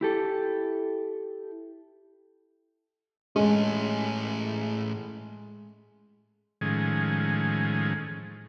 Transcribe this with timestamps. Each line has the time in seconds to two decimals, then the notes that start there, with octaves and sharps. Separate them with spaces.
0.01 E4 G4 A4
3.36 A2 G#3 C#4
6.61 A2 D#3 F3 G#3 C#4 G#4